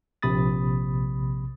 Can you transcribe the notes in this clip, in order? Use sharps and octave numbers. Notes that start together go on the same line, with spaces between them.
A#1 C3 B5 D#6 A6